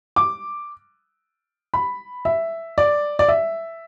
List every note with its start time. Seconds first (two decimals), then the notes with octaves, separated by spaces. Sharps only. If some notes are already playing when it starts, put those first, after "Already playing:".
0.16 D6
1.74 B5
2.25 E5
2.78 D5
3.19 D5
3.28 E5